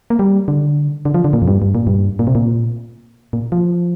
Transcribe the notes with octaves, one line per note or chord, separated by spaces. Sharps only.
A#3
G3
D3
D3
F3
D3
A#2
F2
G2
G2
A#2
G2
A#2
C3
A#2
A#2
F3